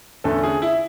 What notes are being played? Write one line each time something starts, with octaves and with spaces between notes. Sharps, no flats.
E2 D3 A3 C#4 A4
G#4
E4